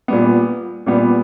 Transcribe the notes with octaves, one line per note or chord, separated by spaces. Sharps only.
A#2 G3 B3
A#2 G3 B3